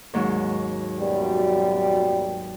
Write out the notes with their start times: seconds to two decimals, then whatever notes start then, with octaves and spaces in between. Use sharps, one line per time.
0.14 D#2 G#2 F#3
0.99 F#2 B2 G3